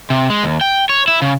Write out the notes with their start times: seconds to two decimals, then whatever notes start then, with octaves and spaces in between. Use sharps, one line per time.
0.10 C3
0.30 G#3
0.43 D#2
0.61 G5
0.89 C#5
1.08 E4
1.22 C#3